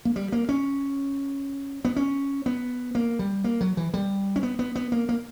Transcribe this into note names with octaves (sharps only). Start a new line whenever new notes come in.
A#3
G3
A#3
C#4
B3
C#4
B3
A#3
G3
A#3
F#3
E3
G3
C#4
B3
B3
B3
A#3
A#3